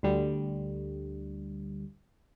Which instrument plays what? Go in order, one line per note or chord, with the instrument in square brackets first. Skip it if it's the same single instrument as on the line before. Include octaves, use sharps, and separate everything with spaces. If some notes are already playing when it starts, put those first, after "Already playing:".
[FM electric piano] D2 D3 G3